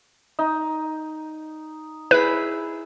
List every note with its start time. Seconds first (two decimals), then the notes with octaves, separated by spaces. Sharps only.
0.39 D#4
2.11 E4 G#4 B4 B5